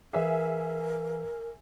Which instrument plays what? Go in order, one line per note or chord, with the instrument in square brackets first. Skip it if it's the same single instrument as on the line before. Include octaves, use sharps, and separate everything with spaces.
[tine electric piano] E3 B4 F5 [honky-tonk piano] G#4 E5 [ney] A#4